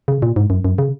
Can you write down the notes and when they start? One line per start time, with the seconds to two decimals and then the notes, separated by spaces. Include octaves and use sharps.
0.08 C#3
0.22 A#2
0.36 G#2
0.50 F#2
0.65 F#2
0.78 C#3